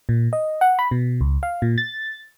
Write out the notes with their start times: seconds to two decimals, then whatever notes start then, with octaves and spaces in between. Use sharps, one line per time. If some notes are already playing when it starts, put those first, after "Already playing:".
0.09 A#2
0.33 D#5
0.61 F#5
0.79 B5
0.91 B2
1.21 C#2
1.43 F5
1.62 A#2
1.78 A6